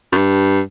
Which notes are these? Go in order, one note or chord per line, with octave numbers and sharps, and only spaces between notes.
F#2
G2